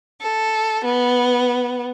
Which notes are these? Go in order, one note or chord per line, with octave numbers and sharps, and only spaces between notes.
A4
B3